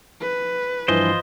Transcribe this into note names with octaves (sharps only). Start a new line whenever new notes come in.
B4
G2 E3 F3 F4 C5 D#5